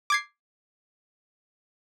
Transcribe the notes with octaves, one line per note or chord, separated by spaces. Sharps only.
D6 G#6 C7